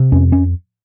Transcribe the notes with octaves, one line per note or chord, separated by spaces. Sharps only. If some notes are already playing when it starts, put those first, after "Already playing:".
Already playing: C3
F2 C#4
C#4